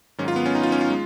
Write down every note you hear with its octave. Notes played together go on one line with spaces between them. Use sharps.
G#2 D#3 F#3 C#4
F4
B3
C#4
D#4
F4
C#4
F4
G#3